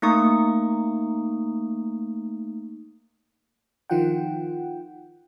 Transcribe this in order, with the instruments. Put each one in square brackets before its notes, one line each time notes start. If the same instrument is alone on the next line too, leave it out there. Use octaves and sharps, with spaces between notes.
[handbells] A3 A#3 D#4 C#6 D#6
[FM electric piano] D#3 F3 F4 F#5 G5